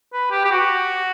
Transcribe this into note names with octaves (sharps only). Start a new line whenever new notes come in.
B4
G4
G4
F#4